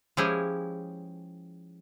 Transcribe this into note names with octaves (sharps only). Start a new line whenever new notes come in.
F3 G#3 C#4 E4 G4 G#4